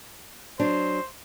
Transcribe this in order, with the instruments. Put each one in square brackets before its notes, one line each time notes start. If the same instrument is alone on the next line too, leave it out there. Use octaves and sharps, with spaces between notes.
[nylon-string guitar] F#3 D4 [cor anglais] C5